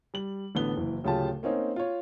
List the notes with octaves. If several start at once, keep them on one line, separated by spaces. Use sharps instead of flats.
G3 F#7
A1 D3 B3 G7
F#1 E3
D1 C#3 F#3 F4 G4 A5
A#3 C4 C#4 D#4
F4 C#5